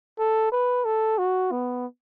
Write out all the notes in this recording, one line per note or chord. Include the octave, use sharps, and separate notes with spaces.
A4
B4
A4
F#4
B3